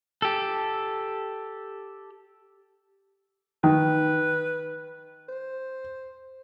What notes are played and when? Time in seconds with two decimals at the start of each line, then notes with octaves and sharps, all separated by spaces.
0.22 G4 A4
3.64 D#3 B4
5.29 C5